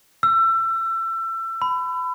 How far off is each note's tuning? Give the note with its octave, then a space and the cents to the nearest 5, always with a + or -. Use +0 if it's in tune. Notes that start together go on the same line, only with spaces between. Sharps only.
E6 +30
B5 +25